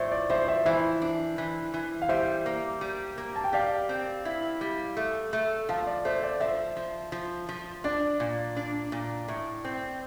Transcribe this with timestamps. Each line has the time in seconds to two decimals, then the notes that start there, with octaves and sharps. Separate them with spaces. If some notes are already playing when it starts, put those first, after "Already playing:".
Already playing: A2 F3 C5 D5 E5
0.12 D5
0.29 F3 C5 E5
0.48 C5 E5
0.65 E3 C5 E5
1.02 D4
1.38 E3
1.74 E3
2.02 F5
2.09 G3 C5 E5
2.46 A#3
2.81 G3
3.18 A#3
3.36 A5
3.44 G5
3.53 G4 D5 F5
3.89 C4
4.25 E4
4.61 G3
4.97 A3
5.33 A3
5.69 F3 F5 A5
5.86 D5
6.05 A3 C5
6.23 D5
6.40 F3 C5 E5
6.77 F3
7.12 F3
7.49 F3
7.84 D4 D5
8.20 A#2
8.56 D4
8.92 A#2
9.28 A2
9.65 C4